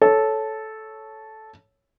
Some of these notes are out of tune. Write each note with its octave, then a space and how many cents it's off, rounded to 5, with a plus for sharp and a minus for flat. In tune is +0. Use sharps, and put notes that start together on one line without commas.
A4 -10 C#5 +0